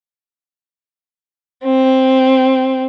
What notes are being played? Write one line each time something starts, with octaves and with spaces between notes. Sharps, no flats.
C4